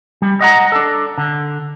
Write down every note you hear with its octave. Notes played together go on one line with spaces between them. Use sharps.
G3
D#5 F#5 A#5
D4 A4
D3